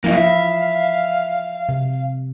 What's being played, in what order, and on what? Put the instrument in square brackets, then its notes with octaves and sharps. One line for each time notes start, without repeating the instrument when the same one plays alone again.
[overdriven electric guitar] F#2 A#3 [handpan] F3 E4 D#5 [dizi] F5
[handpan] E4 [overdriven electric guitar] E5
[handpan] C3